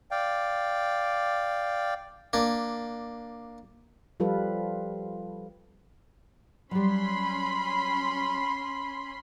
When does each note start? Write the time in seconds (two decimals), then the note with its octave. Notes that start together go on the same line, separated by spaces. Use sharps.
0.11 D5 F5 G5
2.33 A#3 D4
4.20 F3 G3 F4 A4 B4
6.71 F#3 G3 C#4 B5 C6